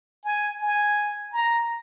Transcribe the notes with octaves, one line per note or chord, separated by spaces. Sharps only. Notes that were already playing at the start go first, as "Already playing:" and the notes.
G#5
G#5
A#5